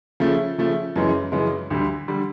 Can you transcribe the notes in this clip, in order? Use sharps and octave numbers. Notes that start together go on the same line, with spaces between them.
C#3 F3 A3
C#3 F3 A3
F#2 C#3 E3 G#3
F#2 C#3 E3 G#3
D2 D3 G3
D3 G3